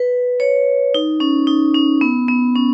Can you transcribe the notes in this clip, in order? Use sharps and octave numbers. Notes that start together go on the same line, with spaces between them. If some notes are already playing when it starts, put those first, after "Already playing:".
Already playing: B4
C#5
D#4
C#4
D#4
C#4
B3
B3
C#4